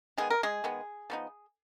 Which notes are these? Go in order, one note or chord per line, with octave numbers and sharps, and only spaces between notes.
D#3 G#3 B3 G#4
A#4
G#3 G#4
D#3 G#3 B3
F3 B3 D#4